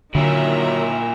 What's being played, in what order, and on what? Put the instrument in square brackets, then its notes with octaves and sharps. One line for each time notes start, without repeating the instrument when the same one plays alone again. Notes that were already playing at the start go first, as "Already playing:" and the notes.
[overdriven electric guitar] A#2 E4 [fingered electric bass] D3 [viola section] D#3 E5 A#5 [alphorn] F#3